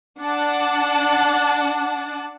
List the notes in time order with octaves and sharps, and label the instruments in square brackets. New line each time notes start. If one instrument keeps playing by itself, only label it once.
[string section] D4 F#5 A5